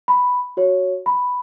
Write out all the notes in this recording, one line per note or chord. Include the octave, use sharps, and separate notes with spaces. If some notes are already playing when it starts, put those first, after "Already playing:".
B5
F#4 C#5
B5